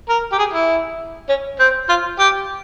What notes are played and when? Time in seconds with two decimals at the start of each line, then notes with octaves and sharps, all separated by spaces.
0.09 A#4
0.32 G4
0.38 G#4
0.54 E4
1.29 C#4
1.59 C4
1.89 F4
2.19 G4